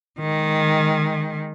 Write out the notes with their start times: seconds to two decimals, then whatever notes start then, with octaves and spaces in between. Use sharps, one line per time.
0.21 D#3 G#3